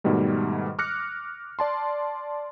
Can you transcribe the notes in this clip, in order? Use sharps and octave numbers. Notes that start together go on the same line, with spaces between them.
G#2 B2 D#3 G3 A3
D6 F6 F#6 A#6 C#7
D5 A5 C6